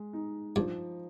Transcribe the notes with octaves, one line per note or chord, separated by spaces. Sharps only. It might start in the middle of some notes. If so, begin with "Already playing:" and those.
Already playing: G#3
D#4
G2 F3